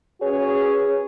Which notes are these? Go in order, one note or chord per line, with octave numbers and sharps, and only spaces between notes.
C#4 F#4 G#4 B4 C#5